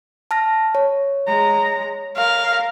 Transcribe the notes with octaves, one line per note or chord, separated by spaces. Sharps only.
A5 F6 A#6
C#5
G#3 A#5
A#4 F5